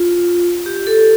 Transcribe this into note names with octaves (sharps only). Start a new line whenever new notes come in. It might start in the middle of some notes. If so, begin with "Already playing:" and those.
Already playing: F4
G4
A4